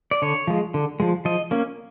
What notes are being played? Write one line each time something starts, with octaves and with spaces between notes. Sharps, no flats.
D5
D3 C#5
F3 G#3
D3
F3 G#3
F3 D#5
A#3 C#4